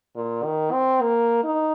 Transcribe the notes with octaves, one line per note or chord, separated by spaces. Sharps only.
A#2
D#3
C4
A#3
D#4